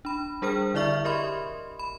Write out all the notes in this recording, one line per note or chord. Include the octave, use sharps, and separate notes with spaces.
D4 B5
G3 D4 G#4 A#4 C5 F6
D3 E4 D5 E5 C#6 F6
G4 A#4 D#5 B5 C6
B5